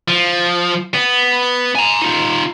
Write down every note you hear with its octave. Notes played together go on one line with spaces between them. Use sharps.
F3
B3
G#5 A#5
D#4 F4